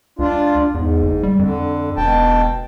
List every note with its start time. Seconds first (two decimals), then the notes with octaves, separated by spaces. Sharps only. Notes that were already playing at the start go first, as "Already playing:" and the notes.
0.19 C#2 D4 F4
0.74 E2 G#2
1.03 F#1
1.23 G3
1.39 F2 D3
1.97 E1 B2 G5 A5